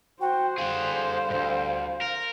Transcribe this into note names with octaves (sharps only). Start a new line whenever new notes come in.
F#4 C5 G5
D3 G3 G#4 F5 F#5
D2 G#2
A#4